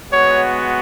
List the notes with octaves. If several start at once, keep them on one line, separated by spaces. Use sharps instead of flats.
G#3 B3 F#4 C#5